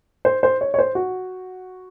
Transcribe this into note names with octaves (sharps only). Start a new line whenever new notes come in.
C5
C5
C#5
C#5
C5
F#4